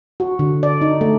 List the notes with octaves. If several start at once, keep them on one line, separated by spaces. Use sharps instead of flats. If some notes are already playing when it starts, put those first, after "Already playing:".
F#4
D3
D5
D#4
A3